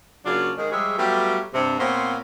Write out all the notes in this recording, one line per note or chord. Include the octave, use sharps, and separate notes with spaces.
C#3 F#3 A#3 D4 F4
G#2 D#3 G#3
F3 G3 G#3 G#4 C#5 E5
F#3 G3 A3 B3 F4 G4
G2 C3
A#2 B3 C4 F4 C5 C#5